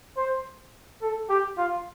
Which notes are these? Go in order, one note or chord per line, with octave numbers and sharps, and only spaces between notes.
C5
A4
G4
F4